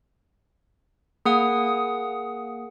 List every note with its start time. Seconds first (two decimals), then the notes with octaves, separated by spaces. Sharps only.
1.25 A#3 G#4 F#5 D#6